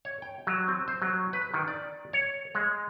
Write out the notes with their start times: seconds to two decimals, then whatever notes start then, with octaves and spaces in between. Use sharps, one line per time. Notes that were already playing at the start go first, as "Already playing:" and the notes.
0.05 C#5
0.22 G5
0.47 F#3
0.68 C4
0.88 C5
1.02 F#3
1.33 B4
1.54 D#3
1.68 D5
2.13 C#5
2.55 G#3